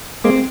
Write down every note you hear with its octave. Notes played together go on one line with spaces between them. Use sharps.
G#3 A#3 C4